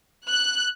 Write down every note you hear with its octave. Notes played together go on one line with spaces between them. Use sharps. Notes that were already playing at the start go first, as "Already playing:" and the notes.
F#6